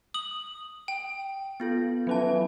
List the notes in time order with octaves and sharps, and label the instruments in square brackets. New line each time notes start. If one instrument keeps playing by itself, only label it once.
[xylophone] D#6 F#7
G5
[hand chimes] B3 F4 A4
[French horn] E3 [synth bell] F#3 C#4 A5